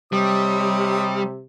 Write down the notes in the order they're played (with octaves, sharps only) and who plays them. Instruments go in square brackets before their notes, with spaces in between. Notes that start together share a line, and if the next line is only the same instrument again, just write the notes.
[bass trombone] C3 [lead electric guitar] G3 [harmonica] C#5 D#5 D#6